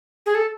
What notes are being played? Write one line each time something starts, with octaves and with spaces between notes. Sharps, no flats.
G#4
A4